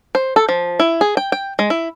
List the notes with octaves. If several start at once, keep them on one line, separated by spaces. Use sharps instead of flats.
C5
A4
F3
E4
G#4
G5
G5
G#3
E4